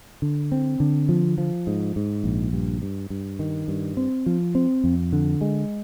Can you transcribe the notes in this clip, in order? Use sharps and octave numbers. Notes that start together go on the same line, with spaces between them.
D3
C4
D3
F3
F3
G#2
G#2
A#1
G2
G2
G2
D#3
G2
C4
F3
C4
F2
D3
G#3